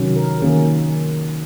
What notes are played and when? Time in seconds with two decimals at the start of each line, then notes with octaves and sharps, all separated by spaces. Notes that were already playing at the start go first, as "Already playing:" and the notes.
Already playing: C3 D#3 F#3 C#4
0.16 A#4
0.42 D#3 A#3 C#4 G#4